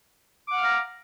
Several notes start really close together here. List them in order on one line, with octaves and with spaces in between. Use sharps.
D6 F#5 F6 F5 A#5